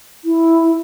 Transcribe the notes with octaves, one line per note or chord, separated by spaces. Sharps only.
E4